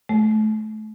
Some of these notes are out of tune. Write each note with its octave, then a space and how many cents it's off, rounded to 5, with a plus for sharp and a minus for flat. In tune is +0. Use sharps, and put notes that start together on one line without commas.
A3 -30